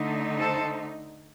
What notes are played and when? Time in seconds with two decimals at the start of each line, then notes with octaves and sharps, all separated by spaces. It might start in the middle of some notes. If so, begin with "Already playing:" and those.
Already playing: D3 A3 D#4
0.39 A4 C5